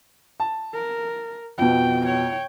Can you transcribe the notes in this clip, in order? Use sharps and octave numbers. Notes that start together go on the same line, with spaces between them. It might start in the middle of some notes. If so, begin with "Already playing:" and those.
A5
A#4
F2 B2 G5
C#5 G5